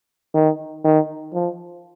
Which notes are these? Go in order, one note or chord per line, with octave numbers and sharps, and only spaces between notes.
D#3
D#3
F3